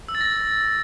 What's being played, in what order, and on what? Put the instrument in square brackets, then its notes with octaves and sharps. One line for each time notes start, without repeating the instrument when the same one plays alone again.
[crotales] E6
A6
A#6